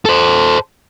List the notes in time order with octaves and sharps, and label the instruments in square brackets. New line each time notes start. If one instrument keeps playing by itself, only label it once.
[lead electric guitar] A4 C5